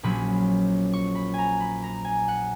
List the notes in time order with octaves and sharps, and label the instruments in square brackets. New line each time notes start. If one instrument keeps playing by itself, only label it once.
[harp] A#1 A#2 F#3 C#4 B5
C#6
B5
G#5 A#5
B5
A#5
G#5
F#5